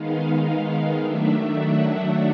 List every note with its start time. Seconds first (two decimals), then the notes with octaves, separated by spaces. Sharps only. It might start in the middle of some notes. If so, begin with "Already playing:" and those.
Already playing: D#3 G#3 B3 D#4 F5
1.03 D#3 F#3 A3 D4 E5
1.58 F#5